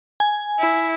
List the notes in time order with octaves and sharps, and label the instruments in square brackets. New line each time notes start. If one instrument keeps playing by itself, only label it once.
[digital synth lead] G#5
[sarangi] E4